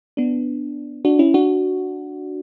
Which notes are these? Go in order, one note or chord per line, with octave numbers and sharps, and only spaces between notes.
B3 D4
D4 F#4
C#4 E4
D4 F#4